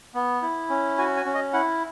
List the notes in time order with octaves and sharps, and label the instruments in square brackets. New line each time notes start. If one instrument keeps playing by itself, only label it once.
[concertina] B3
E4
C#4
F#4 G#5
G#5
C#4
D#5
E4 F#5